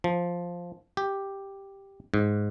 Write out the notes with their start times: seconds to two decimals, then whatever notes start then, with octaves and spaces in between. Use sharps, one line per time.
0.04 F3
0.97 G4
2.14 G#2